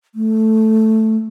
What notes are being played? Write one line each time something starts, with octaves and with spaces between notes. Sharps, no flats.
A3